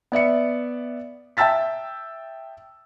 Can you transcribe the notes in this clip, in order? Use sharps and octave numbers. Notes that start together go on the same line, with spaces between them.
B3 D5 E5 C#7
E5 G5 A5 E6 A6 B6